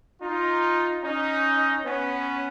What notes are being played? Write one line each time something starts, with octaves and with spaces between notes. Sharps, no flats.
D#4 F4
C#4 D#4
B3 C#4